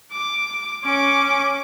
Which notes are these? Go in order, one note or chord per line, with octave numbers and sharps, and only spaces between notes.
D6
C#4 D6